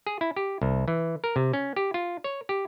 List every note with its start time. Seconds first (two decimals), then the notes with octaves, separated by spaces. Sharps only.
0.07 G#4
0.21 E4
0.36 G4
0.62 C2
0.88 E3
1.24 A#4
1.36 C3
1.53 C#4
1.76 G4
1.94 F4
2.24 C#5
2.49 G4